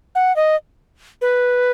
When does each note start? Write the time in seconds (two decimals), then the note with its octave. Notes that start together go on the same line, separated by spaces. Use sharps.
0.15 F#5
0.36 D#5
1.21 B4